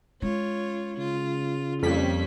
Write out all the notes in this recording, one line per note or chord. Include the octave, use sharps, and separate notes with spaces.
G#3 C#4 F4 C#5
C#3 F4
F2 G3 A#3 C#4 B6